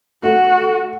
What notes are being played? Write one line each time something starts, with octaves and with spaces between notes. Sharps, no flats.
A3 F#4